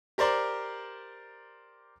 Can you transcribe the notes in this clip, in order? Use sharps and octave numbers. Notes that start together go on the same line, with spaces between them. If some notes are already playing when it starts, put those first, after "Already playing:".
G4 A#4 C5 D5 A#5 C6